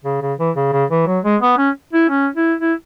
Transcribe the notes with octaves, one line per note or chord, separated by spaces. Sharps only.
C#3
C#3
E3
C#3
C#3
E3
F#3
G#3
B3
C#4
E4
C#4
E4
E4